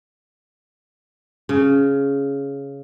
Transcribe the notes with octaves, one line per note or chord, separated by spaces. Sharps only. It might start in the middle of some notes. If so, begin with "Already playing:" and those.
C#3